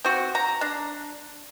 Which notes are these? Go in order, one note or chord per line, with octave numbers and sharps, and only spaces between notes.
C4 F#4
A#5
D4